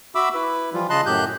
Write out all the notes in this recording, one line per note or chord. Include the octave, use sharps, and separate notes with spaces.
F#4 E5 B5 D6 E6
E4 B4
E3 F3 G3 F4
C#3 D#5 A5 C6 F#6
F#2 A2 G4 F#6 G6